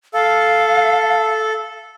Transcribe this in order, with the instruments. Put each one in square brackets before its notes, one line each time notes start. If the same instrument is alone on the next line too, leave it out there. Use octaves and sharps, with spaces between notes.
[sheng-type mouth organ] A4 [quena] F5